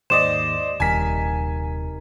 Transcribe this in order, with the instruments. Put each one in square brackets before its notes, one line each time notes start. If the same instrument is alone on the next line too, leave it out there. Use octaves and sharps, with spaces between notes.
[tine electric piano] D#2 G#2 [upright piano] C5 D5 D#5 [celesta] E7
[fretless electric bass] D#1 [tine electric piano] C3 D#4 A#4 [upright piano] G#5 B6